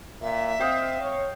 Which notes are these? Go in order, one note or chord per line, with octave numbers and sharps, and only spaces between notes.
A#2 E5
C4 D#5 F5 G5
C#5